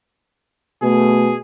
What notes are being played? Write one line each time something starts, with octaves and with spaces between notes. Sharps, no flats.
B2 A3 G#4